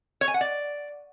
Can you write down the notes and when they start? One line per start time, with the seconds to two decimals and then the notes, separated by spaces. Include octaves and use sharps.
0.21 C#5
0.28 G#5
0.34 F#5
0.41 D5